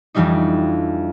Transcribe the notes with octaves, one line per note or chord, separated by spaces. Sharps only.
F2 E3 G3 D4 D#4